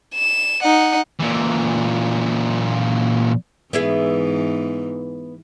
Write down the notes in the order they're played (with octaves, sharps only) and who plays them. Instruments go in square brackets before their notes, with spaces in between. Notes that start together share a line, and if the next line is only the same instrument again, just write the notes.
[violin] E7
D#4 F#5
[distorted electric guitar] A#2 E3
[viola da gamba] G#2 E3 [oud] B3 E4 G#4